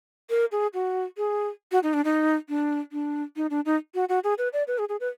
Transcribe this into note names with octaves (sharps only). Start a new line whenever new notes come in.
A#4
G#4
F#4
G#4
F#4
D#4
D4
D#4
D4
D4
D#4
D4
D#4
F#4
F#4
G#4
B4
D5
B4
G#4
G#4
B4